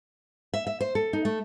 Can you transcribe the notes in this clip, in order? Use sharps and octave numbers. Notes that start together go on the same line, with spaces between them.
E5
E5
C5
A4
D#4
A3